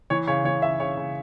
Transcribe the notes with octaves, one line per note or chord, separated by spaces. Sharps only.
E3 C#5
C#3 C#5
E3 C#5
C#3 E5
C#3 C#5
C#3